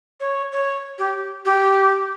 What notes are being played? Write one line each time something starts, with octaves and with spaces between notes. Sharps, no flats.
C#5
C#5
G4
G4